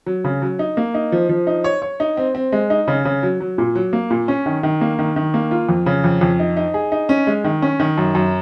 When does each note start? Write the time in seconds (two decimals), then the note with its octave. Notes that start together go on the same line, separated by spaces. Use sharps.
0.06 F#3
0.24 C#3
0.42 F#3
0.59 D#4
0.77 A#3
0.94 D#4
1.12 F3
1.29 F3
1.47 D#4
1.64 C#5
1.82 C#5
2.00 D#4
2.17 C4
2.35 C4
2.52 G#3
2.70 D#4
2.88 C#3
3.05 C#3
3.23 F#3
3.41 F#3
3.58 A#2
3.75 F#3
3.93 A#3
4.11 A#2
4.28 C#4
4.46 D#3
4.63 D#3
4.81 A#3
4.99 D#3
5.16 D#3
5.34 A#3
5.51 F4
5.69 F2
5.86 C#3
6.04 F2
6.21 F2
6.40 D#4
6.57 D#4
6.74 G#4
6.92 D#4
7.09 C#4
7.27 G#3
7.44 D#3
7.62 C#4
7.80 D#3
7.98 F#2
8.15 F#2